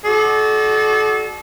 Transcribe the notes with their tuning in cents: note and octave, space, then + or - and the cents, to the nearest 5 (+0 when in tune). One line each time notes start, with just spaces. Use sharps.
F#4 +15 A4 -35 D5 +25